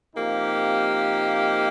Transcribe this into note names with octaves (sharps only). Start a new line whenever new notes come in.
C3 F3 A#3 D#4 G4